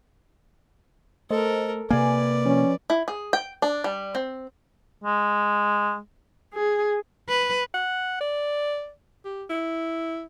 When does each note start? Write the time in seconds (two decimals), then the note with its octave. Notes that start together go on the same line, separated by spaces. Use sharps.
1.30 A3 A4 A#4 C5 D#5
1.90 C3 A#3 B4 D5 G#5
2.46 F3 C#4
2.90 E4
3.08 G#4
3.33 G5
3.62 D4
3.84 G3
4.15 C4
5.04 G#3
6.54 G#4
7.28 B4
7.74 F#5
8.21 D5
9.25 G4
9.50 E4